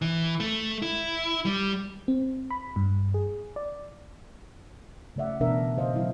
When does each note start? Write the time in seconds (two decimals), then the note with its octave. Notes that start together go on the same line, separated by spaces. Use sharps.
0.02 E3
0.40 A3
0.82 E4
1.45 G3
2.08 C4
2.51 B5
2.76 G2
3.14 G#4
3.56 D5
5.16 C#3 A3 D5 E5 F#5
5.40 B2 E3 B3 D4 A#4 E5
5.77 C#3 C5 D#5 F5
5.93 B2 D#3 F#3 E4 F5